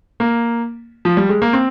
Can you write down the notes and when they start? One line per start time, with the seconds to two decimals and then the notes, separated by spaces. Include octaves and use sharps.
0.20 A#3
1.05 F3
1.17 G3
1.29 G#3
1.42 A#3
1.53 C4